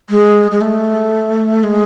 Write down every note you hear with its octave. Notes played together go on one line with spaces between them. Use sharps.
G#3
G#3
A3
G#3